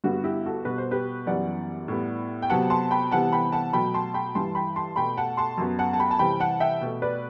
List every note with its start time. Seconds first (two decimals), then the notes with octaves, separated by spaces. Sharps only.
0.04 G2 D3 G3 B3 F#4
0.24 E4 G4
0.45 F#4 A4
0.65 B2 G3 B3 B4
0.78 C5
0.91 G4 B4
1.26 F#2 E3 G3 B3 D5 F#5
1.88 A2 G3 B3
2.42 G5
2.50 C3 F#3 B3 F#5 A5
2.70 A5 C6
2.91 G5 B5
3.12 C3 E3 G3 B3 F#5 A5
3.33 G5 B5
3.52 F#5 A5
3.73 B2 F#3 A3 G5 B5
3.94 A5 C6
4.14 G5 B5
4.35 G2 E3 G3 A5 C6
4.55 G5 B5
4.76 A5 C6
4.96 B2 A3 G5 B5
5.17 F#5 A5
5.37 A5 C6
5.58 F#2 F#3 B3
5.79 F#5 A5
5.93 A5
6.00 G5 B5
6.11 A5
6.19 C3 E3 G3 G5 B5
6.40 F#5 A5
6.60 E5 G5
6.81 B2 A3
7.02 B4 D5